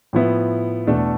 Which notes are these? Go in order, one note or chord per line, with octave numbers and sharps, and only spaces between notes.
A2 F3 B3 E4
E2 B2 A3 D4 A4